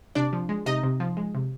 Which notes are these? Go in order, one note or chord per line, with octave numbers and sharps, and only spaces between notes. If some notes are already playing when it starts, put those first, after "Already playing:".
C3 D4 D5
F3
G#3
C3 D#4 D#5
C3
F3
G#3
C3